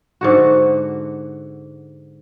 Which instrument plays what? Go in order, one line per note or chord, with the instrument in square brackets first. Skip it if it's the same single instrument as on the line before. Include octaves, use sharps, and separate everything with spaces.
[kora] G#2 D3 F#4